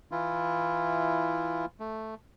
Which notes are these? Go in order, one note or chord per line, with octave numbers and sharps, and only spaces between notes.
E3 E4 F4
A3